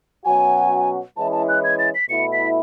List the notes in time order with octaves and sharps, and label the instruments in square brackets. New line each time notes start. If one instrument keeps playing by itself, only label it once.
[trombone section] B2 F#3 C#4 F#4 [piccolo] G#5
[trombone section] E3 G#3 C#4 E4 [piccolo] A5
[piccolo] A5
F#6
G#6
A6
B6
[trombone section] B2 A3 E4 [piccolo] C#7
[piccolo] B6